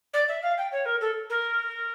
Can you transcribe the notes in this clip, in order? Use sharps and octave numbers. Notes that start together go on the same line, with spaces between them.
D5
E5
F5
G5
C#5
A#4
A4
A#4